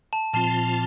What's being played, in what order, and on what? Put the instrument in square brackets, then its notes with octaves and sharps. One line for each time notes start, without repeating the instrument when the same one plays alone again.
[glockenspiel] A5
[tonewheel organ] A#2 F3 C4 F4 [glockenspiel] A5